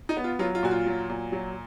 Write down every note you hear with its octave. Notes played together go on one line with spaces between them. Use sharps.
D#4
B3
F4
F#3 F4
F4
A#2 F#4
F4
F#3
A#2
F#3